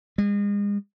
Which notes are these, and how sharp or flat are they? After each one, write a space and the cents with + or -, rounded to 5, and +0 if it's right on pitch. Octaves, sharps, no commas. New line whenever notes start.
G#3 -35